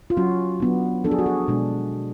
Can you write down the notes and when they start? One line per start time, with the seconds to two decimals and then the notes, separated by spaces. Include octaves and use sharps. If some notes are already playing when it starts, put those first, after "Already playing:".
0.10 F4
0.17 F#3 C#4 F#4
0.60 F#3 B3 D4
1.04 F3 B3 D4 A4
1.11 G#4
1.19 F#4
1.26 G#4
1.48 B2 G#3 D4